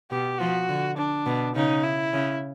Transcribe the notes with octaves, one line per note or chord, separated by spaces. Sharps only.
B2 G4
F3 F#4
D3
D4
B2
C#3 D#4
E4
C#3